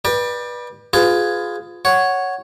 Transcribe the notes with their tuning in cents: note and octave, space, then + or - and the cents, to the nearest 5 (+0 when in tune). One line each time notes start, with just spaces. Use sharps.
B4 -20 D5 +25 G5 +20
F4 +15 G#4 +0 B4 +35
C#5 +0 F#5 +0